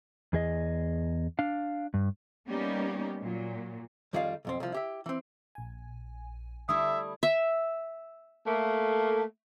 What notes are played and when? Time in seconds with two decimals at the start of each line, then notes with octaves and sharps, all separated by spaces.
0.33 E2 G#4 D#5
1.39 D4 F5
1.94 G2
2.49 G3 A#3 B3 C#4 D#4 G4
3.22 A#2 F#3
4.13 F2 D#3 G3 F4 G#4 F5
4.45 B1 F2 C4
4.60 C2 F3
4.72 E4 G4 E5
5.06 E3 C4
5.55 A#1 G#5
6.69 D3 G3 A3 E4 E5 D#6
7.23 E5
8.46 A3 A#3